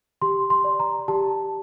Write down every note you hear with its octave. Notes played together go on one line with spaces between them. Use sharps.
G4 C6
C6
D5
A#5
G4 A5